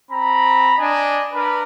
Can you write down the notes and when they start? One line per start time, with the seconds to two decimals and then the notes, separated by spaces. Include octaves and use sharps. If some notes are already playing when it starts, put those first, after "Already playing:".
0.11 C4 A#5 B5
0.79 D4 D5 D#5 G#5
1.33 D4 A#4 B4 B5